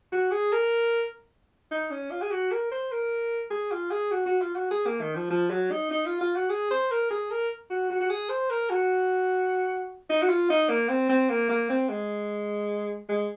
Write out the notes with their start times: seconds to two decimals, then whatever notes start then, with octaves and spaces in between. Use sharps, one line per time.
0.12 F#4
0.31 G#4
0.52 A#4
1.71 D#4
1.91 C#4
2.11 F4
2.22 G#4
2.31 F#4
2.52 A#4
2.72 C5
2.91 A#4
3.50 G#4
3.72 F4
3.91 G#4
4.11 F#4
4.26 F#4
4.42 F4
4.56 F#4
4.71 G#4
4.86 A#3
5.01 D#3
5.16 F3
5.30 F3
5.50 F#3
5.71 D#4
5.91 D#4
6.06 F4
6.21 F4
6.36 F#4
6.50 G#4
6.71 C5
6.91 A#4
7.11 G#4
7.31 A#4
7.70 F#4
7.90 F#4
8.00 F#4
8.10 G#4
8.29 C5
8.50 A#4
8.70 F#4
10.10 D#4
10.22 F#4
10.29 F4
10.50 D#4
10.69 A#3
10.89 C4
11.09 C4
11.30 A#3
11.49 A#3
11.70 C4
11.89 G#3
13.09 G#3